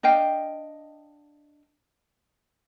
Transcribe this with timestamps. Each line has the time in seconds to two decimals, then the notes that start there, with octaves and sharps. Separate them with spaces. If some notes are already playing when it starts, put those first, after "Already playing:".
0.03 D4 D#5 F5 G5